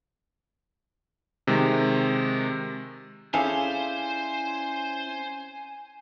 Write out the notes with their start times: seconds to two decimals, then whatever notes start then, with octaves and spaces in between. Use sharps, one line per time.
1.47 C3 D#3 G#3
3.34 C#4 E4 G#4 A4 C5 D5 F5 G#5